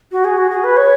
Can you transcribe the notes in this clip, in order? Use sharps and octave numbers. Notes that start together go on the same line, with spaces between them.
F#4
G#4
F#4
G#4
B4
C#5